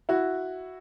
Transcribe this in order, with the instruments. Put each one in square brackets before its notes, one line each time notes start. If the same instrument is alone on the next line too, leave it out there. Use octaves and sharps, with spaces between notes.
[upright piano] E4 F#4